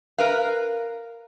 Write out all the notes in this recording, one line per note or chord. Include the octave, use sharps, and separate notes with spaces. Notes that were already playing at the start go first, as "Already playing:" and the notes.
A#4 B4 F5